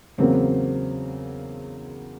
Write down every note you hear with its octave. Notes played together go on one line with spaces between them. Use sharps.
E2 C#3 F#3 A#3 C4